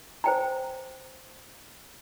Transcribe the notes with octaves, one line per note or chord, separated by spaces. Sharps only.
C5 C#5 G5 G#5 A#5